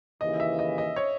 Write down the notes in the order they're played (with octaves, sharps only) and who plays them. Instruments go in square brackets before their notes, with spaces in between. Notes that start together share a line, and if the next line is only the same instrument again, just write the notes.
[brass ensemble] D#2 C#3 E3 [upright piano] D#5
[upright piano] E5
D#5
D#5
C#5